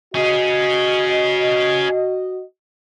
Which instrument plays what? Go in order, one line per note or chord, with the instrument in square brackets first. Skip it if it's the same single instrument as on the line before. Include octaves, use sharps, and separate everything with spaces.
[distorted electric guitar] C#4 G#4 [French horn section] F#4 D#5